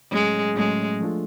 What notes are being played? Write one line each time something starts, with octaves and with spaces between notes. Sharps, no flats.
A2 F#3 G#3 A3 C#4
A2 F#3 G#3 A3 C#4
F3 A3 D4 F4 A4